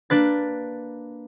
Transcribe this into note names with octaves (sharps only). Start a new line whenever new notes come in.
A#3 D4 B4 A6